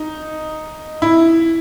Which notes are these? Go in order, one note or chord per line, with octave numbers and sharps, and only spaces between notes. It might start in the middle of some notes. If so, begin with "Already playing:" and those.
Already playing: D#4
E4